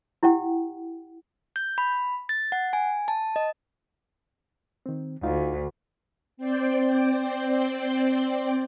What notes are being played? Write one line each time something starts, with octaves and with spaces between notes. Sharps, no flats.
E4 G4 F#5 G5
G6
B5
A6
F#5
G#5
A5
D#5
D#3 C4
D2 D#4 F4 F5
C4 C5 D5 G5